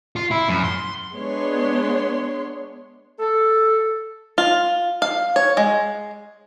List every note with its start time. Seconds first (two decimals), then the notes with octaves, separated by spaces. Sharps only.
0.16 F4
0.31 E4
0.49 F#2
0.64 C6
1.13 G#3 B3 D4 C#5 C6
3.19 A4
4.38 F4
5.02 F5
5.36 C#5
5.57 G#3